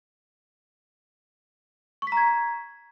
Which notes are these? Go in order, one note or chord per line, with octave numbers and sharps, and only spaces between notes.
A#5 C#6 G#6 B6